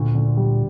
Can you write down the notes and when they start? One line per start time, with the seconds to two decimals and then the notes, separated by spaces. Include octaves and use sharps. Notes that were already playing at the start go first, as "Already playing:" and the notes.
Already playing: D2 A#2
0.15 D3
0.37 G3